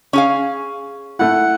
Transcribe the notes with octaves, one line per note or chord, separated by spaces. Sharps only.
C#4 G#4 F5
A3 E4 F#5